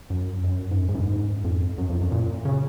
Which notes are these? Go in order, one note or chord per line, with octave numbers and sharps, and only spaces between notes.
F#2
F#2
G#2
F#2
G#2
F#2
G#2
F2
F#2
F2
F#2
A#2
C#3